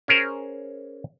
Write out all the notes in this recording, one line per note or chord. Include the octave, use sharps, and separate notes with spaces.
C#4 G#4 A#4 C5